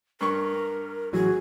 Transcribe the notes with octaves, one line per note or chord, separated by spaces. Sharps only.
G2 A#4 C#6
A1 E3 F#3 F#4 G#4